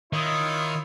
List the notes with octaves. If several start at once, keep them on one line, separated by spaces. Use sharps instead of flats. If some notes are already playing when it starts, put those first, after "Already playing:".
D#3 E4 F4 C#5 D#6